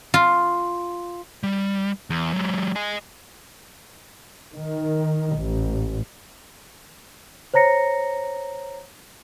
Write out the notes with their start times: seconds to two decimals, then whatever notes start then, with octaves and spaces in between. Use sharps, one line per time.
0.14 F4
1.43 G3
2.10 E2
2.33 F#3 G#3
2.76 D#5 G#5
4.55 D#3
5.39 A1
7.54 C5 C#5 A#5 A#6 C#7